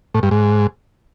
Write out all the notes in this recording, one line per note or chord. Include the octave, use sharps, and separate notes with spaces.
A2
G2
G#2